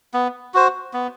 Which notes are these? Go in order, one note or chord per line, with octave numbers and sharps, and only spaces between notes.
B3
F#4 C5
B3